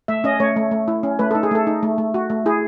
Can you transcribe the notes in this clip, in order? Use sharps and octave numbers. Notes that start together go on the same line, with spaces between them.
A3 E5
C#4 D#5
A3 C#5
A3
A3
E4
C#4
A3 B4
D#4 A4
G#4
A3 A4
D#4
A3
A3
F#4
A3
E4 G#4